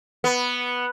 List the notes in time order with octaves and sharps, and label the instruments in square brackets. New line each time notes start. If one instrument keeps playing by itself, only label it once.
[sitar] B3